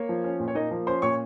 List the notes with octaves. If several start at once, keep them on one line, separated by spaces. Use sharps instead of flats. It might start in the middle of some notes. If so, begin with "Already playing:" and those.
Already playing: A#3 C#5
F3
C#4
A#2
C#5
A#3 D#4 D#5
F3
C#4 C5 C6
A#2 C#5 C#6